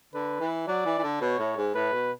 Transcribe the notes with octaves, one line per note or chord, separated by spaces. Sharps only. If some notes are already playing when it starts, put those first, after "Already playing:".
D3 B4
E3
F#3 D5
E3
E3
D3
B2 C#5
A2
G#2
A2 B4
B2